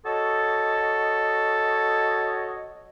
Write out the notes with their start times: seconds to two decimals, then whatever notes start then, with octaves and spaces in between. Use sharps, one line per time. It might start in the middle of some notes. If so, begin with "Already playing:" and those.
0.06 F#4 A4 C#5 D#5